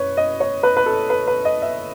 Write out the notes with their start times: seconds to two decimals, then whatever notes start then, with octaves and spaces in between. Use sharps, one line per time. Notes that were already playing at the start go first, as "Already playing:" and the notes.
Already playing: F#2 B4 C#5
0.17 D#5
0.40 C#5
0.63 B4
0.77 B4
0.86 A4
1.10 B4
1.27 B4
1.45 D#5
1.62 E5